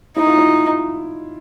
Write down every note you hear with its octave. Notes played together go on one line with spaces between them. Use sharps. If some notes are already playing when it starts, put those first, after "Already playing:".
D#4 E4
F4
E4